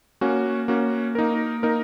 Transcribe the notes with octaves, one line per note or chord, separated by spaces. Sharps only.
A#3 C#4 F#4
A#3 C#4 F#4
A#3 D#4 A#4
A#3 D#4 A#4